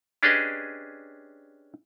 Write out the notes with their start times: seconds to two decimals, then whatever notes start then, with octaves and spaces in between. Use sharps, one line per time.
0.23 C#4 D4 G4 G#4 B4 D#5